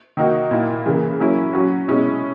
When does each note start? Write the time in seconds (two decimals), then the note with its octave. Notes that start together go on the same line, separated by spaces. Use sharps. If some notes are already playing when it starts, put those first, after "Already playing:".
0.17 D#3 A#3 D#4 F#4
0.51 A#2 A#3 E4
0.86 C#3 E3 A#3
1.20 F#3 A#3 C#4 E4
1.53 F#3 C#4 F#4
1.88 B2 G#3 C#4 E4